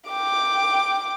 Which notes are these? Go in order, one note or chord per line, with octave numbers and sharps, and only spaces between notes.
G5 D6